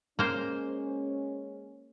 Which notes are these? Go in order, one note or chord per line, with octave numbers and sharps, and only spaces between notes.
G#3 A#3 C#4 C5